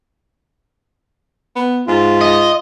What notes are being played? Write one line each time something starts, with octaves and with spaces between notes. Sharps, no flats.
B3
G#2 F4
D#5